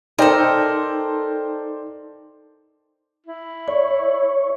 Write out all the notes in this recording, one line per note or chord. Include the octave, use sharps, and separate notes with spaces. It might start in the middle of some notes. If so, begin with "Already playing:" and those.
D#4 A4 A#4 C5 D5 G5
E4
C#5 D5